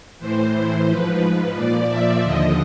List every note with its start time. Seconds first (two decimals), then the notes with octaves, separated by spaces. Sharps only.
0.19 A2 E3 C5
0.87 G#2 F3 B4
1.55 A#2 F3 D5
1.89 E5
2.23 D#2 D3 F3 D#5